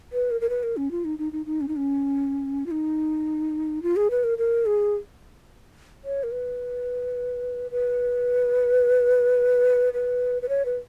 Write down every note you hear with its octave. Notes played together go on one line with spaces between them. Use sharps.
B4
A#4
A#4
B4
A#4
C#4
F4
D#4
D#4
D#4
D#4
C#4
D#4
C#4
F4
D#4
F4
G#4
B4
A#4
A#4
G#4
C#5
A#4
B4
B4
B4
B4
C#5
B4